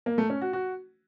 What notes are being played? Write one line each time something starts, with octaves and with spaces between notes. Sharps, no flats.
A#3
A3
C#4
F#4
F#4